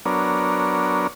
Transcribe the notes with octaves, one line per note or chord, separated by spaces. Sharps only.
F#3 B3 D4 A#4 C#5